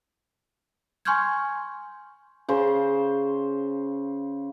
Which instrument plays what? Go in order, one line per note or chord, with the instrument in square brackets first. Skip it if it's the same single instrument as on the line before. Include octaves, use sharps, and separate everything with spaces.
[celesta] G#5 C6 C#6 F6 G6 G#6
[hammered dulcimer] C#3 C5